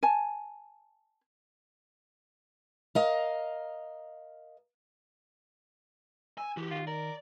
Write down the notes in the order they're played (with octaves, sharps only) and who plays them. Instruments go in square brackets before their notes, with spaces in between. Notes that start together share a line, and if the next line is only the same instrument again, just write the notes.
[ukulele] G#5 A5
[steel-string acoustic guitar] A#4 D#5 F5
[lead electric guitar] G#5 [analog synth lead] E6
[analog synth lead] E3 [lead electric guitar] F#4 G4
[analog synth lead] D#3 [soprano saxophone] F4
[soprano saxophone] A#4 [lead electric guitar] D5